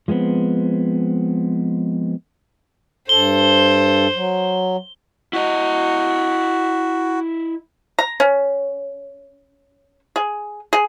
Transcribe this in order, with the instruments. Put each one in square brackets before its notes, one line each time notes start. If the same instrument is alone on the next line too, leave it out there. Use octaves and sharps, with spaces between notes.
[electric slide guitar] F3 G#3 A3 B3 C4
[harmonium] G2 A4 [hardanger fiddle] C5 [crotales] G7
[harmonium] F#3
[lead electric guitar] E4 D#5 [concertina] F#4
[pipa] A#5
C#4
G#4
G#4